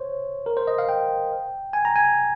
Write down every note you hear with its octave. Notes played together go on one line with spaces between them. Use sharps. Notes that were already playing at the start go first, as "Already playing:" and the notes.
Already playing: C5 C#5
A#4
C5
D#5
F5
G5
G#5
A#5
G#5